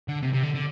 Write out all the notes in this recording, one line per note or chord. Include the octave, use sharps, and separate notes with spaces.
D3
C3
C3
D3
D3